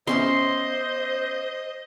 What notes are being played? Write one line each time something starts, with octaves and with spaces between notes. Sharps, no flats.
B3 C#4 C5 D#5 E5 C6